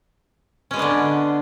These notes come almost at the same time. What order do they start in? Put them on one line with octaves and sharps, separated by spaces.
C#4 G#3 B3 D4 D3